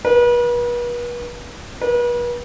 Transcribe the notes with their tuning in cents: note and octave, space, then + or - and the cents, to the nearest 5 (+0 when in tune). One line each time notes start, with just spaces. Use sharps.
B4 -40
B4 -40